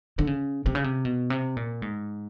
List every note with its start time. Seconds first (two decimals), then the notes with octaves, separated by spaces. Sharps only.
0.19 D3
0.27 C#3
0.66 C3
0.75 C#3
0.84 C3
1.05 B2
1.30 C3
1.57 A#2
1.82 G#2